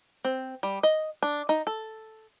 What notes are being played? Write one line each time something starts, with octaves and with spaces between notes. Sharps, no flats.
C4
G3
D#5
D4
D#4
A4